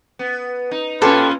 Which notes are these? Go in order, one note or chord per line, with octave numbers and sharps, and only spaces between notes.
B3
D#4
A#2 C#4 F4 G4 A4 B4 C6